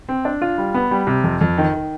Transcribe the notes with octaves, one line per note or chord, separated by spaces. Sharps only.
C4
D4
F4
G3
B3
G3
C3
F2
F2
D#3
D#3